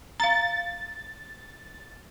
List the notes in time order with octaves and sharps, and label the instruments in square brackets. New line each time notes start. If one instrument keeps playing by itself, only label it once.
[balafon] F5 A#5 [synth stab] A6